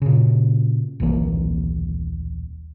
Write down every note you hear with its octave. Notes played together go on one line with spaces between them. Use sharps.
A#2 C#3
D#1 B1 E3 A#3